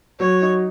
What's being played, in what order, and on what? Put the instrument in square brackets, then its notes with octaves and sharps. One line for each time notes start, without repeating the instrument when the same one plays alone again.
[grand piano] F#3 [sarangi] C#5
[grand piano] D#4